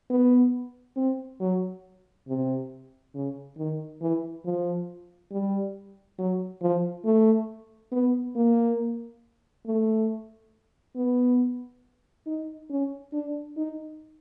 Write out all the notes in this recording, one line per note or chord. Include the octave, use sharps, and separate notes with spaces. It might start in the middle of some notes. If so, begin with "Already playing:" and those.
B3
C4
F#3
C3
C#3
D#3
E3
F3
G3
F#3
F3
A3
B3
A#3
A3
B3
D#4
C#4
D4
D#4